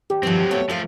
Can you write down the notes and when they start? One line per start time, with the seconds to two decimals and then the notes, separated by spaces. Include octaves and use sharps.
0.10 D#2 G4
0.23 G2 D#3 F3 F#3 C4
0.51 A3 B3 C#5
0.69 F3 A3 A4 F5